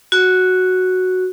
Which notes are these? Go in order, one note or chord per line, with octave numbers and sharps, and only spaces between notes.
F#4